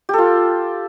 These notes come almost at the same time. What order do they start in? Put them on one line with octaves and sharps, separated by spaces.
G4 A4 F4